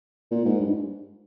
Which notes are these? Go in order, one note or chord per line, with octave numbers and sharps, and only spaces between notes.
A#2
G#2
G2